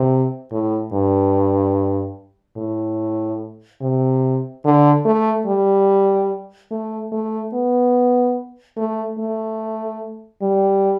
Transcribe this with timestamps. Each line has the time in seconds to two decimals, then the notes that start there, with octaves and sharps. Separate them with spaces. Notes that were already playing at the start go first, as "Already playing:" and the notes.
Already playing: C3
0.52 A2
0.93 G2
2.57 A2
3.82 C3
4.65 D3
5.05 A3
5.47 G3
6.71 A3
7.12 A3
7.53 B3
8.77 A3
9.19 A3
10.42 G3